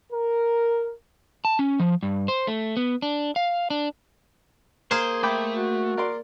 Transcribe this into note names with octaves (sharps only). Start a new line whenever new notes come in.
A#4
A5
C#4
F3
G2
C5
A3
B3
D4
F5
D4
A#3 G#4 C5 C6
A3 G5 B5 D6
F#4
A#4 D5 C6